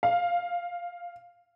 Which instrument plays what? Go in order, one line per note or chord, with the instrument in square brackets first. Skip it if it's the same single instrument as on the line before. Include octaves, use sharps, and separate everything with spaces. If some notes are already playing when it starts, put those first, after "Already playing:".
[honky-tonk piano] F5